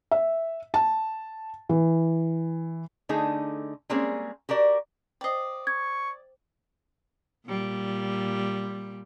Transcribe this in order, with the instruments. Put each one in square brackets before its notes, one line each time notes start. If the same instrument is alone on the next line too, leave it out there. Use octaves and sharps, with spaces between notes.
[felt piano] E5
A5
E3
[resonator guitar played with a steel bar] D3 A3 D#4 G#4
G3 G#3 A#3 C4 C#4 G#4
F#4 G4 A#4 D5
[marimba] C5 G5 [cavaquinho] D5 D#5
[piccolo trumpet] C#6 [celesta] G#6
[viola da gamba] A#2 G3